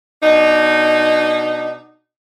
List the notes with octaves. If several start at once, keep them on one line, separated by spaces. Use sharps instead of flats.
B2 D4 D#4